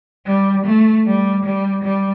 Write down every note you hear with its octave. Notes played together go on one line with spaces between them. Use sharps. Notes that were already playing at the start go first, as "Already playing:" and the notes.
G3
A3
G3
G3
G3